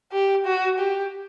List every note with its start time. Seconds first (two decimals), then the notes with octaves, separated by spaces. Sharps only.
0.12 G4
0.45 F#4
0.79 G4